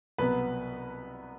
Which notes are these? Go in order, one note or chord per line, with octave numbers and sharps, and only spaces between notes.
C2 B2 F#3 B3 B4